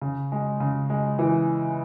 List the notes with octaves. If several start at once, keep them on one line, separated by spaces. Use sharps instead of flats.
C#3
G#3
C#3
G#3
E3